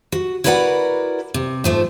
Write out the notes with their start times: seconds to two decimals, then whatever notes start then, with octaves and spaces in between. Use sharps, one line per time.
0.12 F#4
0.44 E4 F#4 A#4 B4 D5 F#5
1.34 C3
1.64 G#2 F3 A3